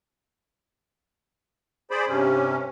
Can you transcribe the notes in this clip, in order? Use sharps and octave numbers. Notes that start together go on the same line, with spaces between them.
G#4 C5 D5 B5
G2 C3 C#4